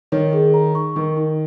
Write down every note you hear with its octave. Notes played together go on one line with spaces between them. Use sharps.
D#3 C#5
G#4
A#5
C#6
D#3 A#4
D#4